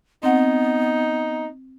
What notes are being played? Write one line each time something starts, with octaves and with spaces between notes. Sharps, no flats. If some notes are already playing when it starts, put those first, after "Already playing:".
B3 C4 D#4 F#5